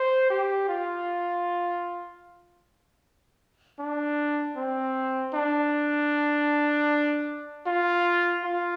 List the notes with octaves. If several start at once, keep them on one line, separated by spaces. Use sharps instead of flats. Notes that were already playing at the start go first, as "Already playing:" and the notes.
Already playing: C5
G4
F4
D4
C4
D4
F4
F4